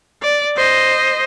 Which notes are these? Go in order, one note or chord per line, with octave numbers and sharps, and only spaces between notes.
D5
C5 D#5